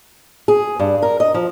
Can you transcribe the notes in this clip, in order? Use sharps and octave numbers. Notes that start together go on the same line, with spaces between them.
G#4
G2
A#4
D#5
F3